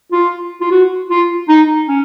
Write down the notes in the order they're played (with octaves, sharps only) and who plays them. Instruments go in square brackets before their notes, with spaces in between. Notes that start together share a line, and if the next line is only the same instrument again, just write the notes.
[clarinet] F4
F4
F#4
F4
D#4
C#4